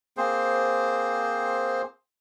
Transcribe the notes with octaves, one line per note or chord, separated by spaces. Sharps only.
A#3 C4 G#4 C5